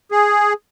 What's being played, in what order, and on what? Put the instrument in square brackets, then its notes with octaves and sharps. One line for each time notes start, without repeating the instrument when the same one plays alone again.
[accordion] G#4